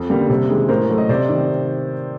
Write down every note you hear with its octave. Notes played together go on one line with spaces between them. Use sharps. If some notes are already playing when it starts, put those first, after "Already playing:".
Already playing: F2
D3 G3 A#3
C3
D#3 G#3
A2 A#4 C5
F#3 A3
D#5
C3 C5 D5
D#3